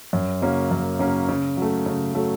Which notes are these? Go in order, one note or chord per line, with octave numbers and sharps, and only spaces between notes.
F#2
C#3 F#3 A#3 C#4
F#2
C#3 F#3 A#3 C#4
C#3
F#3 A3
C#3
F#3 A3